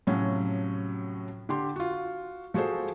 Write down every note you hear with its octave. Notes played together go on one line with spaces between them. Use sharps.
A2 C3 F3 F#3 C#4 F#4
D3 G4 C6
F4 F#4
F3 F#4 G#4 A4 C5